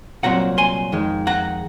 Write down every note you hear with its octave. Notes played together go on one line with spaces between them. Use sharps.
C2 A#2 F#3 C4 F#5 A#5
G#5 C6
F2 D#3 G#3
F#5 A#5